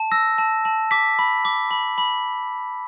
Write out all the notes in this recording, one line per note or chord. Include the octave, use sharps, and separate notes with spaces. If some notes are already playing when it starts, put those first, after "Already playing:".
Already playing: A5
E6 A#6
A5
A5
D6 B6
B5
D6
B5
B5